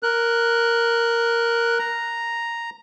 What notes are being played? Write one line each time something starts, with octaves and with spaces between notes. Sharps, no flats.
A#4 F#6
A#5